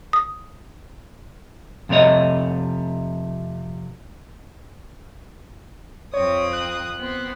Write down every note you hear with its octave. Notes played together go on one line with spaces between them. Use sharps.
D#6
F2 C3 A3 C#5 D#5
F2 C4 C#5 D#6
F#6
B3 C4